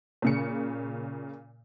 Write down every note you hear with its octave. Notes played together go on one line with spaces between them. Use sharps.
A#2 C#3 C#7